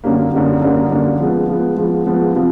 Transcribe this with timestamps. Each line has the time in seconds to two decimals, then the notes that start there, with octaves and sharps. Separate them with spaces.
0.04 F#2 D3 G3 A#3
0.33 F#2 D3 G3 A#3
0.62 F#2 D3 G3 A#3
0.91 F#2 D3 G3 A#3
1.19 F3 G#3 B3
1.48 F3 G#3 B3
1.77 F3 G#3 B3
2.06 F3 G#3 B3
2.35 C3 F3